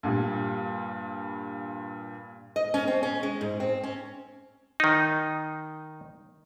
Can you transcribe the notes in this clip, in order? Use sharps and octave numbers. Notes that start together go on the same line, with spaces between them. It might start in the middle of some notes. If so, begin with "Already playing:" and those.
G2 A#2 G3
D#5
C#4
C4
C#4
G#3
G#2
C4
C#4
D#3 D#4